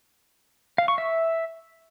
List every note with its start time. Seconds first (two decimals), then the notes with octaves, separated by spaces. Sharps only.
0.78 F5
0.88 C#6
0.98 E5